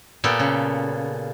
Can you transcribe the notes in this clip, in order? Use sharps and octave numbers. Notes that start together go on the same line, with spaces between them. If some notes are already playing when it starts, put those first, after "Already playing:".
A#2 B3 G4 A4
C#3